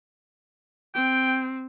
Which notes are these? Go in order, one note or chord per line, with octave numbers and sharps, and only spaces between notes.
C4 G5